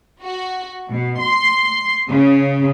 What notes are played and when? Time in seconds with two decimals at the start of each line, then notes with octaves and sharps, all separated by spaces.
0.22 F#4
0.88 B2
1.19 C6
2.08 C#3